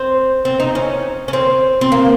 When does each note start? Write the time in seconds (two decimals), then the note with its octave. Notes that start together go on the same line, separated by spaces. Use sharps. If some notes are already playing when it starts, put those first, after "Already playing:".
Already playing: C4
0.45 C4
0.60 D#4
0.75 C#4
1.28 C#4
1.33 C4
1.81 C4
1.92 A#3